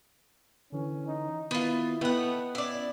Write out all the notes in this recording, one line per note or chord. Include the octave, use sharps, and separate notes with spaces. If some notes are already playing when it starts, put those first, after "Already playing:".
D3 E3 C#4
D#4
D#3 B3 E4 F4
A3 B3 D#5 F#5 G5 B5
C#4 E4 D5